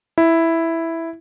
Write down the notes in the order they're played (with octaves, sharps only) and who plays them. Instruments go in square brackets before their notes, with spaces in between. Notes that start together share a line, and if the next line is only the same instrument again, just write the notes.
[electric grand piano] E4